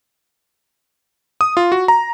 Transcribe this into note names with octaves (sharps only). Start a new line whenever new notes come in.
D#6
F4
F#4
A#5